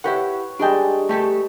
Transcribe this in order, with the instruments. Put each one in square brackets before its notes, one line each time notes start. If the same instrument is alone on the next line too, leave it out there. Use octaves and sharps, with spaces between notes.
[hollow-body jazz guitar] E4 G4 F#5 [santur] B4 C#5
[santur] G3 G#3 A5 [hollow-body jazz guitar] D4 G5
[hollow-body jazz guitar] A3 G4 A4